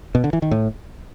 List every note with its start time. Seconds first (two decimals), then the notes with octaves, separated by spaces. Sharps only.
0.15 B2
0.24 D3
0.33 E3
0.42 D#3
0.51 A2